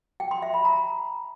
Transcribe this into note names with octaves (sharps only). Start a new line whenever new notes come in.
G5
C6
E5
B5
A#5